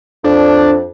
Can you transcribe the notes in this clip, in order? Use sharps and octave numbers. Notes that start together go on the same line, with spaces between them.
F2 D4